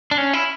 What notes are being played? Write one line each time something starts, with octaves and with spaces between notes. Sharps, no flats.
D4
C#4
E4